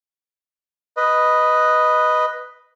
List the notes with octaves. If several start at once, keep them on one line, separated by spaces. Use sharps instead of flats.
B4 D#5